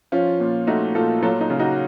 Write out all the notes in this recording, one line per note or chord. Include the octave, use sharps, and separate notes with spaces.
F3 C#4 F4
A#2
A3 D#4 F#4
A#2 F4 A4
F#3 F4 A4
D#4
C#3
D#4 F#4